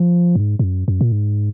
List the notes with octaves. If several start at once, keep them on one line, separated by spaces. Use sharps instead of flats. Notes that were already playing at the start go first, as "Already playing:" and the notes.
Already playing: F3
F#2
G#2
G#2
F#2
F#2
A#2
G#2